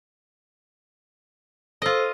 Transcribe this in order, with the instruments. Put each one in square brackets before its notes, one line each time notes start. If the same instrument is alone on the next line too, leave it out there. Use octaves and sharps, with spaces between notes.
[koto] F4 D#5 [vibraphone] A4 C5 E6